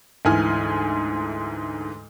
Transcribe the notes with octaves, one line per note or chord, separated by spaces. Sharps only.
D2 G#2 E3 G#5 F6